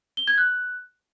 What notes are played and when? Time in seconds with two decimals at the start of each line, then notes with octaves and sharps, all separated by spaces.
0.17 G7
0.27 G#6
0.38 F#6